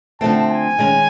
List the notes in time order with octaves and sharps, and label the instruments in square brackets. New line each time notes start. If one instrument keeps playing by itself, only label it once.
[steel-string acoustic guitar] D3 F3 A3 C4 [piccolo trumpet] A5
[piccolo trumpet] G#5
[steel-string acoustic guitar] D#3 G#3 C#4